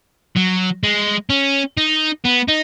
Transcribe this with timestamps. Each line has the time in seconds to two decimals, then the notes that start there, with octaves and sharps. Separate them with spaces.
0.36 F#3
0.83 G#3
1.30 C#4
1.77 D#4
2.24 B3
2.48 D#4